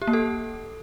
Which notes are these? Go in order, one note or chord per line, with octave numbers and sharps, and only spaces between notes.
G4
A#3
A4